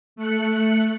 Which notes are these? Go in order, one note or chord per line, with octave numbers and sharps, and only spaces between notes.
A3 F#6 C#7